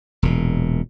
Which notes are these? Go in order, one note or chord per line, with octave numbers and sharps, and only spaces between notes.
E1 A#2